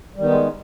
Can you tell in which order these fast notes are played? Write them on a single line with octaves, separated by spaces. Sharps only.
G3 D#3 B3 D#4 G#3